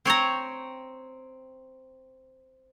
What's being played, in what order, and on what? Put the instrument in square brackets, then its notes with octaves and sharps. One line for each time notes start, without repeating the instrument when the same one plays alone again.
[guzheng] C4 C#5 G5 A#5